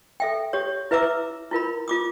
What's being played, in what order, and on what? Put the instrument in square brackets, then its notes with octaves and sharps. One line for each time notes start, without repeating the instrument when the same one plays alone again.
[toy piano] A4 E5 G5
G4 C#5
E4 B4 E5 A#5 D6 E6
E4 F4 A#4 B5
F4 D6 D#6